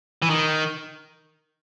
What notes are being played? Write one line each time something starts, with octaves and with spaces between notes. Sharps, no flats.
E3
D#3